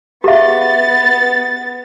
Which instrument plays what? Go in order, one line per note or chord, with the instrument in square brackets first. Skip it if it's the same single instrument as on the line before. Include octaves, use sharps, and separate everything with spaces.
[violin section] B3 A6 [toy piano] G4 G#4 E5